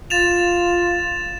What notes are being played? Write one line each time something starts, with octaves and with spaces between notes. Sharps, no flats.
F4 A6 E7 F7